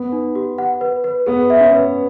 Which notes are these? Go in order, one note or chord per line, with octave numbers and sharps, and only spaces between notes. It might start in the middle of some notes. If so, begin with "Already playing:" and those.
Already playing: B3
D#4
G4
F#5
B4
B4
B3 G#4
E5
C#4
B4